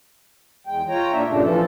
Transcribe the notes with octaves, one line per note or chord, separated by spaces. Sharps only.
E2 G#3 G5
F4 C#5 G5 A#5
A2 A#3 D4 E5
G2 A#2 C#3 A3 D4
E3 F3 A4